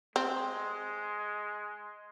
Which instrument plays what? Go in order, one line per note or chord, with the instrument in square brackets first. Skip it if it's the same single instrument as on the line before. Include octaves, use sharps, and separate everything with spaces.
[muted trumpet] G#3 [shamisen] C4